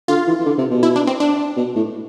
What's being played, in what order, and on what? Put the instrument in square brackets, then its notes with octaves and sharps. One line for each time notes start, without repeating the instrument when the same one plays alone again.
[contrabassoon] D3 [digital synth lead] F4
[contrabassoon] E3
E3
D3
C3
B2
[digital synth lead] E4
D4
C4
D4
[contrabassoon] B2
A2